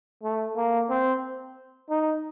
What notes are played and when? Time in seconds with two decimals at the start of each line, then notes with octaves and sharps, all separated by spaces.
0.23 A3
0.57 A#3
0.90 C4
1.89 D#4